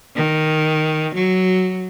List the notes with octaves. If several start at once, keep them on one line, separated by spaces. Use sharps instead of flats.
D#3
F#3